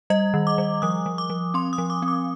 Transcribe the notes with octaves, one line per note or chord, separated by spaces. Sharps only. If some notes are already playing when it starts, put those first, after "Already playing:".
G3 D#5
D#3
D6
G3
F3 D#6
F3
D6
F3
C4 C6
D#6
F3
D6
C4
D6